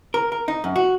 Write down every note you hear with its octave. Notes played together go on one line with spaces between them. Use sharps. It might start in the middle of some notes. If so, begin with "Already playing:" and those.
A#4
A#4
D#4
F#2
F#4